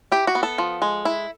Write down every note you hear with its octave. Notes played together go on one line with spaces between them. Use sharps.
E4 G4
F#4
B3
A4
F3
G#3
E4